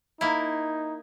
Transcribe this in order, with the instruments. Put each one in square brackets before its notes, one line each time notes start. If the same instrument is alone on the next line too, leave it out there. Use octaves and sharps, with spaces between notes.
[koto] A#3 E4 [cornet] D#4